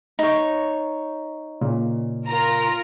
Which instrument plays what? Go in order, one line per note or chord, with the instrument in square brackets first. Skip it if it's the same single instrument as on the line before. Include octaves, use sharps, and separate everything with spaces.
[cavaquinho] D#4 C#5
[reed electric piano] A#2 C#3
[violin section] F4 A#4 A#5